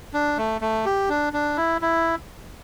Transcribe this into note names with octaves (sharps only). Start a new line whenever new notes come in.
D4
A3
A3
G4
D4
D4
E4
E4